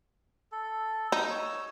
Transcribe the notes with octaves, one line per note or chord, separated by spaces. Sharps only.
A4
D#4
C#5 E6